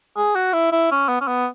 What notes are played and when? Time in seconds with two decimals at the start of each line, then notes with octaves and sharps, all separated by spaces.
0.17 G#4
0.35 F#4
0.53 E4
0.72 E4
0.91 C#4
1.08 B3
1.21 C#4
1.27 B3